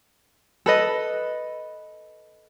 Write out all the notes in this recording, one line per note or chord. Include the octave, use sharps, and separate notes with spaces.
A4 B4 D#5